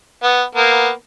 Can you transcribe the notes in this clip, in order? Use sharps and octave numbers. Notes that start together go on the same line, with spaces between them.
B3
A#3 B3